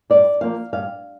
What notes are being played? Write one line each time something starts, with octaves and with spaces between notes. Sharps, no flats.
G2 D5
F3 A#3 F5
G2 F5